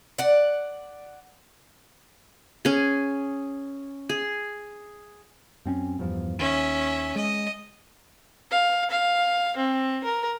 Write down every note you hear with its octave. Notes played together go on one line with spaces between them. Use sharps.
D5 F#5
C#4 G#4
G#4
F#2 C4 C#4
E2 G2 F3
D#2 C#4 E5
G#3 D#5
F5
F5
C4
A#4